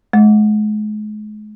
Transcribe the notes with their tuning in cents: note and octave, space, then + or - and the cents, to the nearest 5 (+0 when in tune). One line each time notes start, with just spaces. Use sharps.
G#3 +40